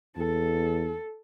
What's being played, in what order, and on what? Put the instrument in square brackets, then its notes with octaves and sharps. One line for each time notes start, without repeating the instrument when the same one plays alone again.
[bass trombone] E2 [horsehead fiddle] A4